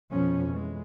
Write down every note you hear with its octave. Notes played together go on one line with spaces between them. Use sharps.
F2 B2 F3 C#4
E3 G#3